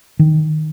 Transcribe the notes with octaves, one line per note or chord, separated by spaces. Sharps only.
D#3